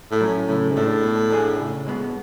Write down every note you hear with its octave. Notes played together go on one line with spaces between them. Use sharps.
A2
F#3 C#4
A2 C#3
G#2
A2 G#3 D4 A4
B2
A3 D4 G#4
C#2
B2 G#3 B3